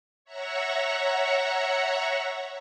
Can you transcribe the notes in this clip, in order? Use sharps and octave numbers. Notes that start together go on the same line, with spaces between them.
C#5 E5 F#5 A#5 C#6